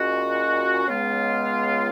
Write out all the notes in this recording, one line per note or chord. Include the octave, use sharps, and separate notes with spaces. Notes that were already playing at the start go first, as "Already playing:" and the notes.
Already playing: A#2 G#3 C#4 F#4
C#2 C#3 G#3 B3 F4